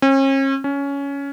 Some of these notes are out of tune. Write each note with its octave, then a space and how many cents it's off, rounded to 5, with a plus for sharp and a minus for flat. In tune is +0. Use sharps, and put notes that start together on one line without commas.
C#4 -40
C#4 +15